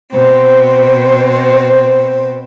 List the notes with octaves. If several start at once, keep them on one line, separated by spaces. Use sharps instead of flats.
B2 C4 C5